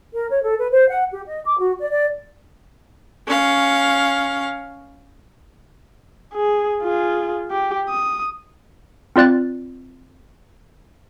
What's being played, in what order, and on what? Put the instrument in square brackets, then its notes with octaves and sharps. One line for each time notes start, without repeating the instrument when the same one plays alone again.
[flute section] A#4
C#5
A4
B4
C5
F#5
G4
D#5
D6
F#4
D5
D5
[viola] C#4 F5
[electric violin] G#4
F4 G#4
G4
D#6
[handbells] C4 F4 D5 F#6 A6